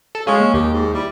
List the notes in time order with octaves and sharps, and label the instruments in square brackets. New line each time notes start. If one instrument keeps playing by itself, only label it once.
[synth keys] A4
[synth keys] G#3 G#4 [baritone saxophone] C#4 [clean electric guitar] F5
[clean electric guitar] A#3
[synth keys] D#2 [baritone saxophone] G4
[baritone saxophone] G#2
[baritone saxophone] G3 [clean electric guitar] E4